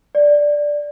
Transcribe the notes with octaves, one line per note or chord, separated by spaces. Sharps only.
D5